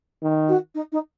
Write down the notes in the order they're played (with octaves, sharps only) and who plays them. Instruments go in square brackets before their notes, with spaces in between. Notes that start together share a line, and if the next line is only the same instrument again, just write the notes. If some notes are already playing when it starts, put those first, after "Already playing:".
[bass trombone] D#3
[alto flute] F#4
D#4
D#4